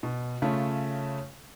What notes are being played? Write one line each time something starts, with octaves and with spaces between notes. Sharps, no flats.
B2
C#3 A3 C#4 F4 A5